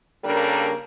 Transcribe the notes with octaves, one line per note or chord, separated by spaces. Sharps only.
C#3 G3 A#3 D4 A4 A#4